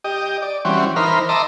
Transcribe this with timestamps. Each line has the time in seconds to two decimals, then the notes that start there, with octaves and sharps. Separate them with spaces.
0.04 G4 D#5
0.42 D5
0.65 E3 G3 C4 C#4 F#4
0.96 E3 D#4 A#4 C5 B5 F6
1.29 D#5 E5 A5 A#5 C6 D6